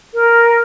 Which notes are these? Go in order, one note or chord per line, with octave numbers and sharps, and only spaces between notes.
A#4